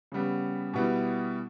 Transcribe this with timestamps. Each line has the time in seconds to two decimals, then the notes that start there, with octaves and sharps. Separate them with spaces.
0.12 C#3 G3 B3
0.74 B2 G3 B3 E4